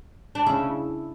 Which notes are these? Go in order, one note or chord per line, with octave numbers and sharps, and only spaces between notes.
D4
C#3 E4